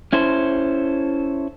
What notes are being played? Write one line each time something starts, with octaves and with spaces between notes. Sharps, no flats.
C#4 E4 A4 C5